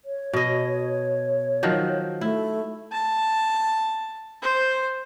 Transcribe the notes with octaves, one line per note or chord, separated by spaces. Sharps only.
C#5
B2 D#5
D#3 F3 F#3
A3 E4
A5
C5